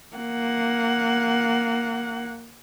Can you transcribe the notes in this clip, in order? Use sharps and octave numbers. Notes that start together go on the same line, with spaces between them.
A#3 F#5